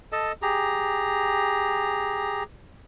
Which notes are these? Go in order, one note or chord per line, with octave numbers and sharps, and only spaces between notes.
A4 D#5 A5
G4 G#4 A#5